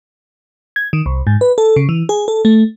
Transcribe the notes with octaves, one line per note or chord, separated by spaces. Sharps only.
G#6
D#3
C2
G#2
B4
A4
C#3
E3
G#4
A4
A3